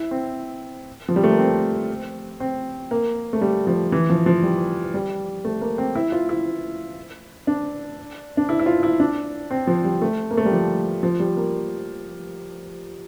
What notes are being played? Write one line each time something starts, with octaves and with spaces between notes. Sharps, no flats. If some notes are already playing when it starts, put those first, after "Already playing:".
Already playing: E4
C4
F3
G3
A3
A#3
C4
C4
A#3
A3
G3
F3
E3
F3
F3
G3
G3
A3
A#3
C4
E4
F4
E4
D4
D4
E4
E4
F4
E4
D4
C4
F3
G3
A3
A#3
A3
G3
F3
F3
G3
A#3